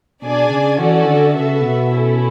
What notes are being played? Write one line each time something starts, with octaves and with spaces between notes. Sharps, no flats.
B2 D4 G#4 D5 G#5
C#3
E3 C#4 F#4 A4 D5
D3
C#3 B3 F#4 A4 E5
B2
C#4 E4 A4